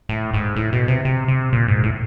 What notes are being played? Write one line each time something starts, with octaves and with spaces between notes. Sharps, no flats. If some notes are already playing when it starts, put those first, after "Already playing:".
A2
G#2
A2
B2
C3
C3
C3
A#2
G#2
A2